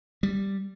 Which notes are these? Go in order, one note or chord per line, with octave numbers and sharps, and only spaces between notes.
G3